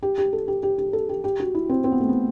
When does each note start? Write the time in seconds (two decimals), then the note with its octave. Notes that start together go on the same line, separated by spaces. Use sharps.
0.03 G4
0.18 G4
0.33 A4
0.48 G4
0.63 G4
0.78 G4
0.93 A4
1.09 G4
1.24 G4
1.40 F#4
1.54 E4
1.69 C4
1.84 C4
1.92 B3
2.01 A3
2.09 B3